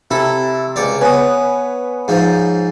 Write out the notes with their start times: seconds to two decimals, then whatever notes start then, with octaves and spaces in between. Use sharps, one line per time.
0.11 C3 E4 A4
0.76 C#2 C#5 D5
1.01 B3 B4 C#5 G#5 D#6
2.08 G#2 F3